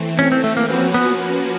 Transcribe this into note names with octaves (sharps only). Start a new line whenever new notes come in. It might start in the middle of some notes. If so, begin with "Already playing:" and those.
Already playing: E3 A3 C4
C#4
C4
A3
A#3
F3 A#3 C4 C#4 F#4 B4
B3